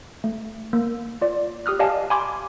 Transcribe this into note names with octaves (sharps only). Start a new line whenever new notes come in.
A3
A#3
F4 D5
G4 D#6 F6 F#6
G4 D5 D#5 F5 G#5 A5
G#5 B5 C6 D6 G#6